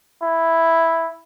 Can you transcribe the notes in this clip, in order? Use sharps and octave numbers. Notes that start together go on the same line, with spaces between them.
E4